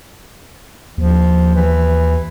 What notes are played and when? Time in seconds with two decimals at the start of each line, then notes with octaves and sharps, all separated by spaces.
0.98 D#2 F3
1.55 E3